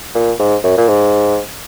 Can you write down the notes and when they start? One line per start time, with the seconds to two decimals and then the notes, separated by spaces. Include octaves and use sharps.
0.15 A#2
0.39 G#2
0.64 F#2
0.78 A#2
0.88 G#2